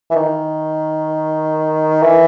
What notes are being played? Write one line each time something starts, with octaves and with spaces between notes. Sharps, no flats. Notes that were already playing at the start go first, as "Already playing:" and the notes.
E3
D#3
E3